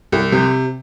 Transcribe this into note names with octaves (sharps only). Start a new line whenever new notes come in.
C2
C3